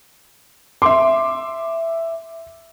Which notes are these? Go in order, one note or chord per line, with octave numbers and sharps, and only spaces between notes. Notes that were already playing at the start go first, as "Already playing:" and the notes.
E5 C6 D6